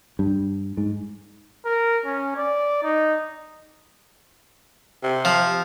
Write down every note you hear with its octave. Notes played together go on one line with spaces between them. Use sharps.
G2
G#2
A#4
C#4
D5
D#4
C3
F3